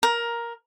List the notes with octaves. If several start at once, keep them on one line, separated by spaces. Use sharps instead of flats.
A#4